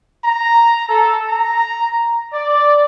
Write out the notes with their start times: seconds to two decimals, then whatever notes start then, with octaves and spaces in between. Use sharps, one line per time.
0.24 A#5
0.89 A4
1.29 A#5
2.32 D5